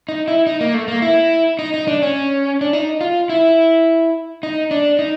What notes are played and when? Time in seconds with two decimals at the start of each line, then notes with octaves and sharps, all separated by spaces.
0.09 D#4
0.28 E4
0.47 D#4
0.61 A#3
0.74 A3
0.88 A#3
1.02 E4
1.59 D#4
1.74 D#4
1.88 D4
2.02 C#4
2.61 D4
2.73 D#4
3.01 F4
3.29 E4
4.43 D#4
4.71 D4
4.99 D#4